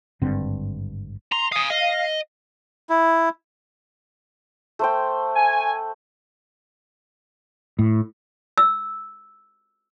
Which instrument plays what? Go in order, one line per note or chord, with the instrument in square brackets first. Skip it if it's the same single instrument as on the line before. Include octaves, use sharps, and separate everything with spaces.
[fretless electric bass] G#1 G2 D3 C4
[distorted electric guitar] A#5 [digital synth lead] C6
[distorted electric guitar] F5 G#5 [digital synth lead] D#6
[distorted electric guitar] D#5 [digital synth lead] F5
[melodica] E4
[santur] A3 C5 G5
[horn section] G#5
[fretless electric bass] A2
[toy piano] E6